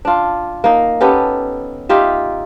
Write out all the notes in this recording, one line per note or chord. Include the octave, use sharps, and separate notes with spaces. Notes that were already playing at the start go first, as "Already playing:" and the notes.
D4 F4
A#3 D#4
B3 C#4 G4 A4
D#4 F4 G4 E5